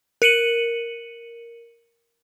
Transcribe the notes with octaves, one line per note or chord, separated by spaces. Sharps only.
A#4 C#7 D#7 F#7